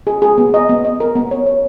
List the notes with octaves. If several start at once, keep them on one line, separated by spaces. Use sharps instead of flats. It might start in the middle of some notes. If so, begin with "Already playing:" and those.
G#4
G#4
B3
D#5
B3
D#5
A#4
B3
C#5
C#5